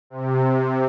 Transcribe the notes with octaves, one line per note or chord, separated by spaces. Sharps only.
C3